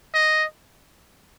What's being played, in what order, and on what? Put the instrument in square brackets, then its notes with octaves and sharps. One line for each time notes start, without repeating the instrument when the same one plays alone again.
[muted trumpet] D#5